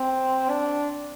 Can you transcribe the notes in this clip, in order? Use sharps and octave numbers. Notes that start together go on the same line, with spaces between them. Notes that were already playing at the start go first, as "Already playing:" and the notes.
Already playing: C4
D4